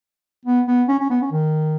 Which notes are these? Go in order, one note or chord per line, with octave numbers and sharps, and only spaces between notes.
B3
B3
C#4
C#4
B3
C#4
D#3